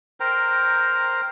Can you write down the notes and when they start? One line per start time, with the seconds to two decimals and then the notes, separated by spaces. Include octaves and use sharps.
0.20 A#4 C5 G5 A#5